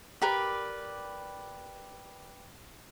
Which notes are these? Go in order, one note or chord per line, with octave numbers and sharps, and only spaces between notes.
G4 A#4 B4 D5